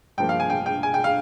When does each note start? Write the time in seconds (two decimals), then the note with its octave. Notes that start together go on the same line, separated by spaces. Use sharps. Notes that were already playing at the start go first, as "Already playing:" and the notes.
0.18 G2 F3 A#3 G5
0.29 F5
0.40 G#5
0.50 G5
0.66 G5
0.83 G#5
0.94 G5
1.04 F5